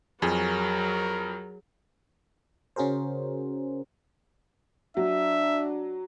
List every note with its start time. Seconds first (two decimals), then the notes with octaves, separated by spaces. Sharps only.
0.22 F2 F#3 G#4 A#4
2.76 C#3 C#4 F#4 G#4 A#4 C5
4.97 F#3 D4 E5